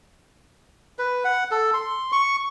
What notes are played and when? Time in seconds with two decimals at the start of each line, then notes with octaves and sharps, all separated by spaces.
0.99 B4
1.25 F#5
1.51 A4
1.73 C6
2.12 C#6